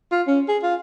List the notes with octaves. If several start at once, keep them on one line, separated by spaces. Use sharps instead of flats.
F4
C#4
G#4
F4